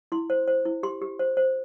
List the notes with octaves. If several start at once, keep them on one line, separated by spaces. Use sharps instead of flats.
E4 C6
C5
C5
E4
G4 C6
G4
C5
C5